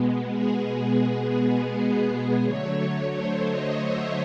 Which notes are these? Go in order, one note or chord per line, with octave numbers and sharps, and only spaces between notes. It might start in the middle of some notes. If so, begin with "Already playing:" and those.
Already playing: B2 G#3 B3
G#4
D3 F#3 A3 C#5
C5
D#5
E5